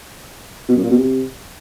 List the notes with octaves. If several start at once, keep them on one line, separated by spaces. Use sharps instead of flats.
B2
F#2
A#2
B2
C3